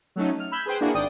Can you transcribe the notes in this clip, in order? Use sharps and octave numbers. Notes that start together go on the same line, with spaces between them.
F#3 A3 C#4 D#4
F6
B5 E6 G6 G#6
G#4 B4 C5 G5
A#3 D4 E4 F#4 G#4
G#1 D5 G5 D#6 D#7